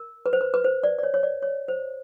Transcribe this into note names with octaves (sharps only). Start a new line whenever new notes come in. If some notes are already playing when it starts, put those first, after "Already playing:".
Already playing: A#4
B4
C5
B4
B4
C5
D5
D5
C#5
C#5
D5
C#5
C5